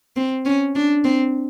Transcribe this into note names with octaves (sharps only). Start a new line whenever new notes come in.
C4
C#4
D4
C4